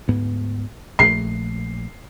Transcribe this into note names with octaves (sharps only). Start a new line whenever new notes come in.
D2 G#2 B3
A#1 A3 C7